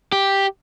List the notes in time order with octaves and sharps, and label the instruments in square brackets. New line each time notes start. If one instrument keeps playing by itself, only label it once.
[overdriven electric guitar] G4